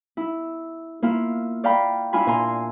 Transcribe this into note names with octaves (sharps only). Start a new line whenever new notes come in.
E4
A#3 E4 F4
D5 F5 G5 A#5 B5
D4 E4 F4 G#5 B5
A#2 G#5 A#5 C6